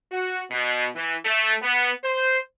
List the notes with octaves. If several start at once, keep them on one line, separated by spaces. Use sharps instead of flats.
F#4
B2
E3
A3
B3
C5